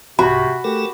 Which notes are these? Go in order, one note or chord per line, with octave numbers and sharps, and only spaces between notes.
C2 G#2 C3 F#4 B5
A3 G4 A4 A#4